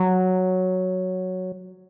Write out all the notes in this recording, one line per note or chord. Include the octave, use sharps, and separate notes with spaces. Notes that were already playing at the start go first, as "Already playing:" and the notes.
Already playing: F#3